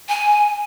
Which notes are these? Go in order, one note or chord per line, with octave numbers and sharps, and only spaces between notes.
G#5